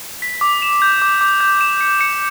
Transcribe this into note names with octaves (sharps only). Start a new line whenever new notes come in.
B6
D6
E7
G6
D6
D6
G6
E7
C#7
C#7